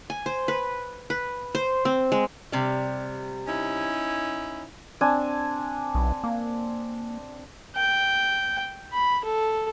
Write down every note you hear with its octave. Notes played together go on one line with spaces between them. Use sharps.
G#5
C5
B4
B4
C5
C4
G#3
C3 G3
C#4 D#4 E4
C4 D4 G#5
B1
A#3
G5
B5
A4